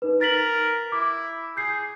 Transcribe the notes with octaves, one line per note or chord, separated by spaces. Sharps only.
D#4 B4
A#4 A6 B6 F#7
E4 D6
G#4 G6 C7